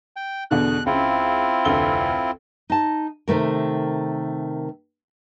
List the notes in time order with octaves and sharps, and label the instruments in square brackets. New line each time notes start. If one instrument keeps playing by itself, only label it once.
[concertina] G5
[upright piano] E2 B2 D3 [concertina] F#6
[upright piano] C#2 [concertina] C4 E4 F4
[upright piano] F1 D2 G7
[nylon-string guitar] D#4 A5
C3 D#3 A3 A#4